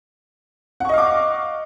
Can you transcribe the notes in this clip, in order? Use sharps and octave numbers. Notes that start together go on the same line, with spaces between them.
D#5 F5 F#5 C#6 D6